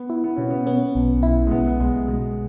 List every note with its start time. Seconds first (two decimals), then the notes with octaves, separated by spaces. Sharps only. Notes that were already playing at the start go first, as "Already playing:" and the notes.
Already playing: B3
0.10 E4
0.24 B3
0.36 B2 C#4
0.51 B3
0.66 B3 C#4
0.95 B1
1.23 E4
1.47 G#3
1.51 B1 B3
1.67 B3
1.80 B1 G#3
2.08 B2 G#3